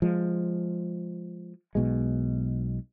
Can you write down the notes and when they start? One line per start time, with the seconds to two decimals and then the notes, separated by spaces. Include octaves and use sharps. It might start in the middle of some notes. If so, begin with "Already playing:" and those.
0.02 F3 G#3
1.75 B1 B2 G#3